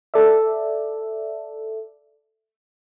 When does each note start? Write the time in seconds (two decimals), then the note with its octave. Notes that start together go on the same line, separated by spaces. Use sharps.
0.14 A4 D5 E5